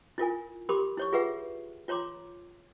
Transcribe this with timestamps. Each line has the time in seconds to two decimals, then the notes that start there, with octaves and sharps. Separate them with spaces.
0.18 E4 F4 A#4 G#5
0.69 G4 A#4 B5 C6 D6
0.97 E4 C#5 C#6
1.13 F4 G#4 B4 E5 F#5
1.88 F4 C#5 A#5 C6 D6